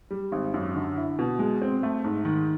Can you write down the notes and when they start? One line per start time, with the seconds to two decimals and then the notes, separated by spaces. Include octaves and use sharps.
0.11 G3
0.32 G#1
0.54 F#2
0.76 D3
0.96 E4
1.19 B2
1.39 G#3
1.62 C4
1.83 A3
2.04 G#2
2.25 D#3